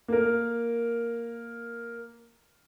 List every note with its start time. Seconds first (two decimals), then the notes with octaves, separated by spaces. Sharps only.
0.08 A#3 A#4